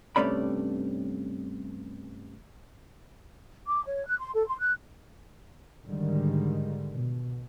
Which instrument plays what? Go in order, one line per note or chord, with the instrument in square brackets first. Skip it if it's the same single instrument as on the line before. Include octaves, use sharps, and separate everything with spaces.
[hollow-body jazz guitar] G2 C3 A3 C#4 D5 B5
[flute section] D6
C#5
F#6
C6
A4
C6
F#6
[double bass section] G#2 D3 D#3 G3 G#3
B2